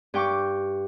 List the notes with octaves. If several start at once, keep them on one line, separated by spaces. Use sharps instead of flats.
G2 G5 C#6 D6